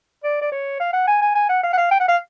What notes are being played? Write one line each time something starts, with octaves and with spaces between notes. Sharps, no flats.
D5
D5
C#5
F5
F#5
G#5
G#5
G#5
F#5
F5
F#5
F5
G5
F#5
F5